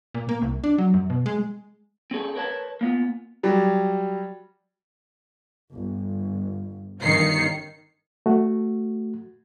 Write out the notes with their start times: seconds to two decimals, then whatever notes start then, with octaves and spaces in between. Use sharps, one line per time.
0.14 A#2
0.29 A#3
0.42 C2
0.64 D4
0.78 F#3
0.94 F#2
1.10 B2
1.26 G#3
2.11 C4 C#4 G#4 A4
2.35 A#4 B4 C#5 F#5 A5
2.81 A#3 B3 F4
3.43 F#3 G3
5.72 G1
7.01 G1 G2 D#3 C#4 C7 C#7
8.26 A3 F#4